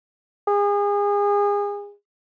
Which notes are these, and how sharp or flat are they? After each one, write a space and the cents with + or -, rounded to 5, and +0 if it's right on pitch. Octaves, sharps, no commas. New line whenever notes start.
G#4 -30